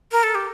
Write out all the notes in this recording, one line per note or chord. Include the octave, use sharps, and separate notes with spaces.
A#4
A4
G4